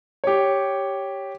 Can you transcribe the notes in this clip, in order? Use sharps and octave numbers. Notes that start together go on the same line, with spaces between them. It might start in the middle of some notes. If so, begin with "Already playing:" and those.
G4 C#5